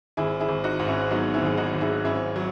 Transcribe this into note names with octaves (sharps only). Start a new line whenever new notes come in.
G#1 E4 G#4
E4 G#4
G#1
D#4 F#4
G#2
C#4 E4
F#3 B3 D#4
C#4 E4
G#1 G#4
D#4 F#4
G#1
E4 G#4
G#2 C#4 E4
F#3